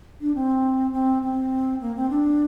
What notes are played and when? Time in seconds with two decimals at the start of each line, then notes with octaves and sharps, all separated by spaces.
0.21 D4
0.35 C4
0.93 C4
1.22 C4
1.81 A#3
1.96 C4
2.10 D4